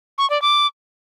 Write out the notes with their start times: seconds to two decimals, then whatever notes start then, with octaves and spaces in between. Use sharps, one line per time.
0.18 C#6
0.30 D5
0.42 D6